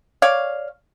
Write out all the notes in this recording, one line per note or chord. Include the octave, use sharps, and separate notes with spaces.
C#5 D5 F5